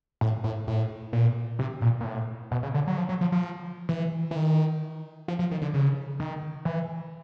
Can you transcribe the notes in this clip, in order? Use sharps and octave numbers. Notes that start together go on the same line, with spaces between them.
A2
A2
A2
A#2
C3
A#2
A#2
A2
B2
C#3
D3
F#3
F3
F#3
F3
F3
E3
E3
D#3
F3
F3
D#3
D3
C#3
D#3
E3